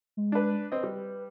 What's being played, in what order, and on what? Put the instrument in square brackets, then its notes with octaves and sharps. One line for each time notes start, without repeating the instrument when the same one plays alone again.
[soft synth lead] G#3
[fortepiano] D4 B4
[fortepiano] C4 D#5 [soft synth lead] B4
[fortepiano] G3